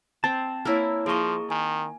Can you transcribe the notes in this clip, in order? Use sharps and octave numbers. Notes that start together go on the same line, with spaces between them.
C4 A5
A#3 E4 C#5 E6 F6
F3 A#3 G#4 D#5 C#6
D#3 G#5